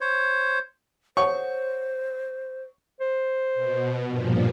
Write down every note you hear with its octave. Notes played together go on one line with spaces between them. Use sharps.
C5 C#5
A4 C5 C#5 F#5 C#6
C5
B2
G2 A#2 F3